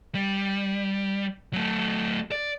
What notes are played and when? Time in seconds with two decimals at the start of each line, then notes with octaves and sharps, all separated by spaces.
0.15 G3
1.53 F#3 A3
2.32 D5